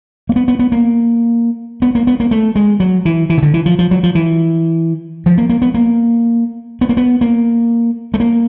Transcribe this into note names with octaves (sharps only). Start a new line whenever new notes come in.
A#3
B3
B3
B3
A#3
B3
A#3
B3
A#3
A3
G#3
F#3
E3
E3
C#3
D3
E3
F3
F3
F#3
F3
E3
F3
A#3
A#3
B3
A#3
B3
A#3
B3
A#3
A3
A#3